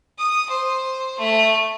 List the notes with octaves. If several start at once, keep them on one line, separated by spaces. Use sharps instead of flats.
D#6
C5
A3